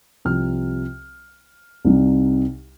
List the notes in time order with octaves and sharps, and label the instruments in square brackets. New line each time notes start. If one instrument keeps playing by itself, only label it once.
[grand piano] C2 C3 F3 C4 F6
C2 C3 G3 D#4